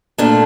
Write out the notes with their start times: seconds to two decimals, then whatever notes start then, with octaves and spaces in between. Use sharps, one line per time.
0.18 A#2 A3 D4